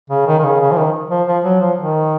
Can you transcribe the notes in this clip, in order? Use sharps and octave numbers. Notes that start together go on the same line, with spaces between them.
C#3
D#3
D#3
C#3
C#3
F3
D#3
F3
F3
F#3
F3
D#3